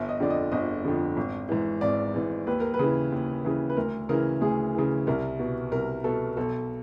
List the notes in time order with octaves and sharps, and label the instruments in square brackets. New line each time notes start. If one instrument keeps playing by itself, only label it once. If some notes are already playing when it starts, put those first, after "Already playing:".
Already playing: [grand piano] G1 E5
D#5
F2 D3 D5
D#5
G1 D#5
F2 D3
G#1
G#2 E3
G#1 D5
G#2 E3
D#2 B4
A#4
B4
C#3 E3
D#2
C#3 E3
B4
D2 A#4
C#3 E3 A#4
D2 G#4
C#3 E3
C2 A#4
B2
C2 A#4
B2 A4
B1 A4